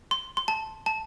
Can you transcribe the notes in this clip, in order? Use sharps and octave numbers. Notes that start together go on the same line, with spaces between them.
C6
C6
A5
A5